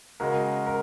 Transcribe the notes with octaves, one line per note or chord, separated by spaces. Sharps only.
C#3 G#3 F#4 A#4
A#4